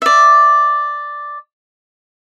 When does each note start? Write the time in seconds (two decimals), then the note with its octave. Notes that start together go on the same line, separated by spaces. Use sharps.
0.02 D5 E5